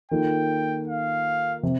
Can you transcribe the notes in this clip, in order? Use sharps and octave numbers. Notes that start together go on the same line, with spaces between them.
D#3 A#3 F4 A4 G5
F5
C3